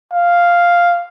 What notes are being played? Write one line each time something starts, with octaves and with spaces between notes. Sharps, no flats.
F5